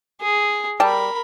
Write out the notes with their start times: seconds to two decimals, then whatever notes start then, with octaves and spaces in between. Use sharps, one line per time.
0.21 G#4
0.80 G3 A#4 G5 A5 B5